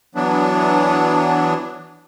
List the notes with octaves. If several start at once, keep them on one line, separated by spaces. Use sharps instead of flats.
E3 F#3 B3 D4